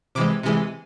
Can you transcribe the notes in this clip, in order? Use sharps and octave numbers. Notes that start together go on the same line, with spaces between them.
C3 E3 G#3 D6
C3 E3 G#3